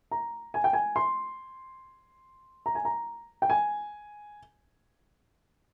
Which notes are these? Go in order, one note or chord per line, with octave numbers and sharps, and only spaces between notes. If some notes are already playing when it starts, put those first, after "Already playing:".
A#5
G#5
G5
G#5
C6
A#5
G#5
A#5
G5
G#5